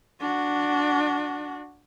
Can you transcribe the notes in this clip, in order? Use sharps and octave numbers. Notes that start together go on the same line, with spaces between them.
D4 F#4